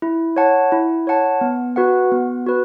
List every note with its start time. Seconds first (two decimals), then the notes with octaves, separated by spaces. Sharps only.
0.02 E4
0.36 C#5 F#5 A5
0.72 E4
1.07 C#5 F#5 A5
1.41 B3
1.76 F#4 B4 F#5
2.12 B3
2.46 F#4 B4